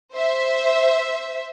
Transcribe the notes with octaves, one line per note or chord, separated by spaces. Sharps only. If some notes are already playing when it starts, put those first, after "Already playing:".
C5 E5